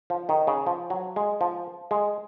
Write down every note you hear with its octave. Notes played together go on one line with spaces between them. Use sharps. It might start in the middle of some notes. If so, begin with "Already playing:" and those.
F3
D#3
C#3
F3
F#3
G#3
F3
G#3